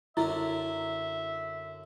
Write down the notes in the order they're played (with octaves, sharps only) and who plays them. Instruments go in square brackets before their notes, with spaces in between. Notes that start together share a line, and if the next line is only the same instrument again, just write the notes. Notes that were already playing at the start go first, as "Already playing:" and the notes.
[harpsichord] F#2 D3 C#4 [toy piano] E4 [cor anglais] E5